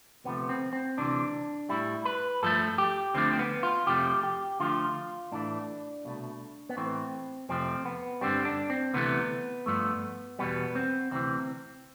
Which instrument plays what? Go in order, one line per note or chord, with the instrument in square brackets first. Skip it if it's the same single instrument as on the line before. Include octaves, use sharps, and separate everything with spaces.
[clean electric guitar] D2 C3 F3 A3 B3
C4
C4
D2 C3 E3 D4
A2 G3 E4
B4
G2 F3 A3 A4
G4
D2 D3 F3 A3 C4
C4
B3
F4
F2 C3 F3 A3 G4
G4
D2 D3 F3 A3 F4
A2 E3 A3 D4
C2 B2 A3
B3
A2 E3 A3 C4
F2 C3 F3 A3 C4
B3
G2 D3 G3 C4
D4
C4
D2 C3 E3 A3 B3
G2 F3 A3
E2 B2 G3 B3
C4
D2 C3 E3 C4